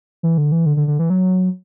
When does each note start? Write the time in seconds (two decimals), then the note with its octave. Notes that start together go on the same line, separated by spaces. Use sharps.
0.23 E3
0.38 D3
0.52 E3
0.66 D3
0.77 D3
0.88 D3
0.99 E3
1.10 F#3